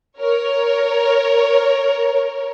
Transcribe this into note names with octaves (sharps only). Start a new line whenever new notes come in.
A#4 C#5